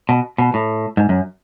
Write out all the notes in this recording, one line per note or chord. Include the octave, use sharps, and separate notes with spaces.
B2
B2
A2
G#2
F#2